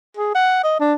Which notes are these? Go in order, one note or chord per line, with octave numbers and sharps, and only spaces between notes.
G#4
F#5
D#5
D4